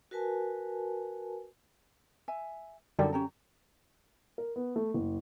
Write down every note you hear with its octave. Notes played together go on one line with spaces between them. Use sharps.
F#4 A#4 B4 G#5 A5
E5 G#5
F#2 D3 G3 D#4 G4 A4
C#4 G4 A#5
A#4
B3
A3
F#1